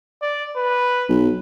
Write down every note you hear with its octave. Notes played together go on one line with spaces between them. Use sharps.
D5
B4
B1